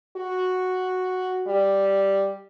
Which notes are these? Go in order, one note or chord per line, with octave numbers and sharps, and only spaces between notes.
F#4
G3